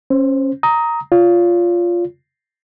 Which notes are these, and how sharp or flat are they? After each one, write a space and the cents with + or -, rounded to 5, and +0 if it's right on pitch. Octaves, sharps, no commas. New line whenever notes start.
C#4 -25 C5 +0
A#5 +0 D#6 +20
F4 +0 C#5 +40